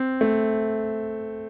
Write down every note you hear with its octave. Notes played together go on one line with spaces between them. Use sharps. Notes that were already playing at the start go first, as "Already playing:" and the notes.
Already playing: C4
A3